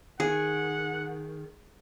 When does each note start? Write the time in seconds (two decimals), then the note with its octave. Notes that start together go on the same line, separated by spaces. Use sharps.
0.20 D#3 G#4 F#5